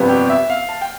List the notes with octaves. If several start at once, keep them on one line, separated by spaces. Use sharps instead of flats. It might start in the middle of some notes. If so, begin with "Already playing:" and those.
Already playing: G1 F2 C3 G3 B3
G4
E5
F5
A5
G5